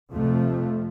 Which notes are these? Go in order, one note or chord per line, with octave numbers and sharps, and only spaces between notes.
F2 C3 F3 A3